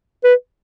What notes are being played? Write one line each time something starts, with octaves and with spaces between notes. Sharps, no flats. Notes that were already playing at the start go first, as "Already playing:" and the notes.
B4